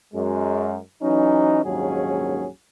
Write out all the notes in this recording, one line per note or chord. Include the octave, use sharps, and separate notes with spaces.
F#2 G#3
E3 F#3 C#4 D#4
A#1 D#2 G#2 F#3 C#4 G#4